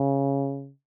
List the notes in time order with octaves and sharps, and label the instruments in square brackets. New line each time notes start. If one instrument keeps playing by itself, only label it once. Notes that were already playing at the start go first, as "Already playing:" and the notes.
Already playing: [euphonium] C#3